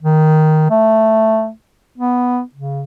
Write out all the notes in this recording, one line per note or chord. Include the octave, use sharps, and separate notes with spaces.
D#3
A3
B3
C#3